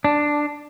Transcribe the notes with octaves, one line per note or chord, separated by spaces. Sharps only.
D4